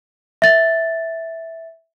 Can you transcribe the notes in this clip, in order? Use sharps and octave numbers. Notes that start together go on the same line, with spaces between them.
E5 A6